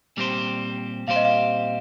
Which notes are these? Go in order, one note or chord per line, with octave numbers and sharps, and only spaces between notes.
A#2 G3 C4 G4 C5
A#2 G3 C4 G4 C5 F5
D#5
F5